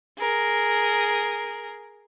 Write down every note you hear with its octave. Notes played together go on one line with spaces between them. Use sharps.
G#4 A#4